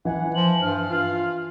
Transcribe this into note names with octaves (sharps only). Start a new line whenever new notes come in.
E3 F#5 G#5
F3 F#7
G2 F6
F4